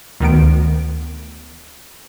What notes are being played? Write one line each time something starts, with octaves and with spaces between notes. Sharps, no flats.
D2 D#3 B3 D7